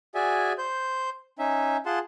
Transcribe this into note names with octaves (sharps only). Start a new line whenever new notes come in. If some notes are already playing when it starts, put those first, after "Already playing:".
F#4 G#4 D5 E5 G#5
C5 G6
C#4 D#4 E5
F4 G#4 F#5 A5 C6